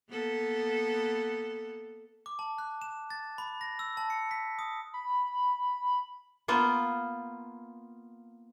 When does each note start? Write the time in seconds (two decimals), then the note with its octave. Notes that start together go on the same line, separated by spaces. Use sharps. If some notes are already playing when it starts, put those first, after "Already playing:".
0.10 A#3 B3 A4
2.26 D6
2.39 A5
2.58 F#6
2.82 E7
3.10 A6
3.38 B5
3.61 A#6
3.79 E6
3.97 A5
4.10 C#7
4.31 B6
4.59 D#6
4.94 B5
6.48 A#3 B3 F4